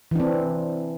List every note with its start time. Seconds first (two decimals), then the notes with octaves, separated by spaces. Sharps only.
0.11 E3
0.16 D4
0.20 C4